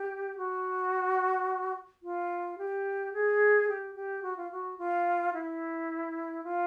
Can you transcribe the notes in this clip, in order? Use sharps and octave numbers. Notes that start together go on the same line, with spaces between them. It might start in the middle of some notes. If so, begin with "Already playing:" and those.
Already playing: G4
F#4
F4
G4
G#4
G4
G4
F#4
F4
F#4
F4
E4
F4